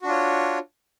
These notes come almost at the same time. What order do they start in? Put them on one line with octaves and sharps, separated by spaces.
F#4 D4 F4 C#5